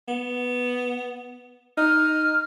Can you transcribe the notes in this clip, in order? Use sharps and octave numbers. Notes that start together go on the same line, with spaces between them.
B3
D#4 F6